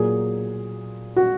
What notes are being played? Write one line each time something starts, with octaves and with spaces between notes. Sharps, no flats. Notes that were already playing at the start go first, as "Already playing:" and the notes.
Already playing: A#2 F#3 A#3 G#4
F#4